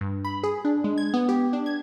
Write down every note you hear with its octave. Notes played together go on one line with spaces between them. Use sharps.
G2
B5
G#4
D4
G#3
G#6
B3
G4
D4
G#6